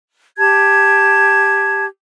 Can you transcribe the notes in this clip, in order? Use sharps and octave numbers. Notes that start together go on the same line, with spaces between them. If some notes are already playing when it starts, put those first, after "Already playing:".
G4 A5 G#6